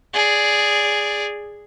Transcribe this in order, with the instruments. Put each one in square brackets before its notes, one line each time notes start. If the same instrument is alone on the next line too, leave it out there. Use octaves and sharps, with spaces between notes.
[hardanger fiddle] G#4 D5